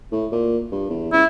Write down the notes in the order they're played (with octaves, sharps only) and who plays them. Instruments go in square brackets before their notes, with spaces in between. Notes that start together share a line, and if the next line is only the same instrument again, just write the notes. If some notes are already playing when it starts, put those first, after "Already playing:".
[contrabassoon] A2
A#2
G2
E2
[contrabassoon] C#2 [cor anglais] E4